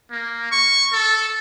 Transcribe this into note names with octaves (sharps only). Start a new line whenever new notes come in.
A#3
C#6
A4